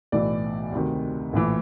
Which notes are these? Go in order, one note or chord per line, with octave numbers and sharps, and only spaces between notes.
B1 A2 E3 D5
D2 C3 D#3
A#1 A2 E3